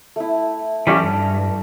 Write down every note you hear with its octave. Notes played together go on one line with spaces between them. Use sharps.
A3 E4
E3 G3 C#4 A4 F#5 A#5
G2